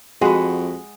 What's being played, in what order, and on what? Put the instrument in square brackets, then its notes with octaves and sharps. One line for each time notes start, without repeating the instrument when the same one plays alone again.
[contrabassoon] F2 [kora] G#3 G#4 F#5 [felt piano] F#4 B5